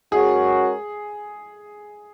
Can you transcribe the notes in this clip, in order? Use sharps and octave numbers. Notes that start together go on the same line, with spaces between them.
G#3 C#4 F#4 G#4 A#4